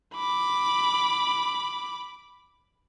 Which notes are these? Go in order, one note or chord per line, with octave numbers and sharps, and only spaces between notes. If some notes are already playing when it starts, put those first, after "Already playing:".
B5 D6